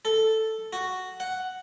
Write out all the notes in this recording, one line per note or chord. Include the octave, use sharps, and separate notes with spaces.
A4
F#4
F#5